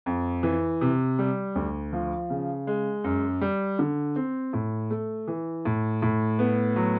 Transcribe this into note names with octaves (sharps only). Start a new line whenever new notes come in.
F2
E3
C3
G3
D2
F3
C#3
G#3
F#2
G3
D3
C4
A2
A3
E3
A2
A2
B3
F#3